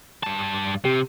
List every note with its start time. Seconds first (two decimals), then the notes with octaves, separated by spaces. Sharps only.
0.23 G2 A5
0.85 C3 G4